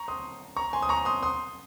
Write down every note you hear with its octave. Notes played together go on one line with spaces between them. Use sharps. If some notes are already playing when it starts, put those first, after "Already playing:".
Already playing: A#5 C#6
C6 D#6
A#5 C#6
G#5 C6
D#6
A#5 C#6
C6 D#6
C6 D#6